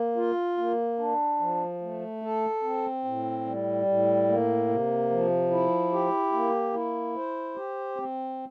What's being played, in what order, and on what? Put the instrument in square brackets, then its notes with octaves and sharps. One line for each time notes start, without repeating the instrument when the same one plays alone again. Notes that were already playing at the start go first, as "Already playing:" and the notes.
Already playing: [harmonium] A#3
F4
A#3
D4
F3
A3
A4
C4
A2
G3
A2
A#3
C3
F3
E4
G4
A#3
E4
C5
G4
C4